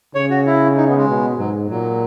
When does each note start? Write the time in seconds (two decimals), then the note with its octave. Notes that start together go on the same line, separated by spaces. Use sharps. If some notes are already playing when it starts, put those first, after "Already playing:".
0.15 C#3 C#5
0.30 F#4
0.46 E4
0.77 D#4
0.88 B3
0.97 G#3
1.08 B2
1.38 G#2 F#3
1.69 A#2 F#3